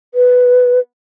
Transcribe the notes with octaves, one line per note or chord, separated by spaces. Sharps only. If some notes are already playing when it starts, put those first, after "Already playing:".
B4